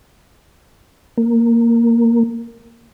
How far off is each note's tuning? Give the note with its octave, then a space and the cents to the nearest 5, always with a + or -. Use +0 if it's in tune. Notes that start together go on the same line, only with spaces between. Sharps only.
A#3 -5